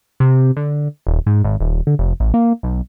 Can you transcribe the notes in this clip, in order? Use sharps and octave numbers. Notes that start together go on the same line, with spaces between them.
C3
D3
D#1
G#2
G#1
D#1
D3
F1
A1
A#3
B1